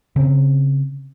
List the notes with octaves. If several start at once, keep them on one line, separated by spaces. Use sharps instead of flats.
C#3 C4